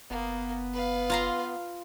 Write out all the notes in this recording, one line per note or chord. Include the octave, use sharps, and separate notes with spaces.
F#1 A#3 B3
B4 F5
F4 A#5 C6